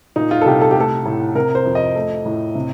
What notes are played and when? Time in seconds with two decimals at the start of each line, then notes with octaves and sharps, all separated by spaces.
0.16 A#2 D#4
0.31 F4
0.41 A4
0.46 C2 G4
0.61 A4
0.71 G4
0.76 A3 A4
1.05 A2
1.35 C3 A#4
1.55 C5
1.66 F2
1.75 D#5
1.95 A3
2.25 A2
2.55 C3